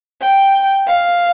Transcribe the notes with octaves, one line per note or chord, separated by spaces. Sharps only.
G5
F5